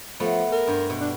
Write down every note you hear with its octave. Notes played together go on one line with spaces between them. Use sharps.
F3 A3 B3
A#4
G2 C5
B2
D4